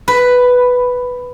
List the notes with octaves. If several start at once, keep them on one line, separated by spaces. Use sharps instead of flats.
B4